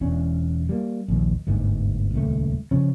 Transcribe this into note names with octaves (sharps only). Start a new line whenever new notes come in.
E1 C#4 D4
G3 A#3
A#1 D#2
G1 D2 G#2 B2
D#1 C#2 A3
C#3 F3 C#4